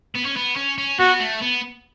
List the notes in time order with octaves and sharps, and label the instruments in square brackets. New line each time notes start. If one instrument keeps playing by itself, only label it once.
[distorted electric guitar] B3
C#4
B3
C#4
C#4
[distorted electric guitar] B3 [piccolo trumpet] F#4
[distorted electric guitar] A3
B3